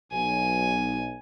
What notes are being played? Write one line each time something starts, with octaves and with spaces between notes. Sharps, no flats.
B1 G#5